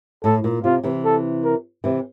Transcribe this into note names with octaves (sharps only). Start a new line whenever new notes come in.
A2 A4
A#2
C3 F4
C3 E3
A4
A#4
C3 E3